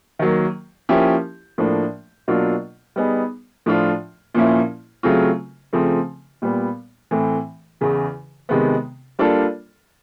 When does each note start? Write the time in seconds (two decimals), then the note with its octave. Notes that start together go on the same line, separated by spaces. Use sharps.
0.19 D#3 F#3 A#3
0.89 F3 A#3 C#4 E4 G4
1.58 A2 F3 A#3 D4
2.28 B2 F#3 A#3 D4 F4
2.96 G3 B3 D#4 G#4
3.66 A2 F3 A3 D4 F4
4.34 A#2 F3 A#3 C#4 E4
5.03 C#3 F#3 A3 C4 F4
5.73 C#3 F3 A3 C4
6.42 A#2 G3 B3
7.11 A2 E3 A3 C4
7.81 E2 C#3 E3
8.49 C3 D#3 G#3 B3
9.19 G3 A#3 D4 F4 A4